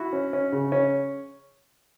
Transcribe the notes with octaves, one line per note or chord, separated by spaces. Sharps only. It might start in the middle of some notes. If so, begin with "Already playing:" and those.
Already playing: E4 F#4
C#4
C#4
C#3
C#4